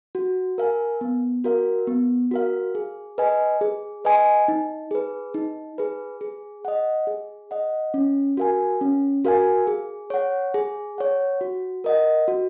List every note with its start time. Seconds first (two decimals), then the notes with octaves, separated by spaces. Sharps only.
0.15 F#4
0.58 A#4 F5 G#5
1.01 B3
1.44 F#4 A#4 F5
1.87 B3
2.31 F#4 A#4 F5
2.75 G#4
3.18 B4 D#5 G#5
3.61 G#4
4.05 B4 D#5 G#5
4.48 D#4
4.91 G#4 B4
5.34 D#4
5.78 G#4 B4
6.21 G#4
6.65 D#5 F#5
7.07 G#4
7.51 D#5 F#5
7.94 C#4
8.37 F#4 A#4 F5 G#5
8.81 C#4
9.25 F#4 A#4 F5 G#5
9.67 G#4
10.10 C#5 F#5
10.54 G#4
10.98 C#5 F#5
11.41 F#4
11.84 A#4 D#5 F#5
12.28 F#4